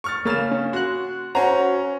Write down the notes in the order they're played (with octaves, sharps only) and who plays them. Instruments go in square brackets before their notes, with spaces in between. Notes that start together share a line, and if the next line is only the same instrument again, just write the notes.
[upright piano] C#6 F6 A6
[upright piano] C#3 A6 [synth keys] A#3 F6 E7
[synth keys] C#4
[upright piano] F#4 [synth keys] C6 F#6
[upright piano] C#4 A#5 [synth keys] F#4 C5 F#5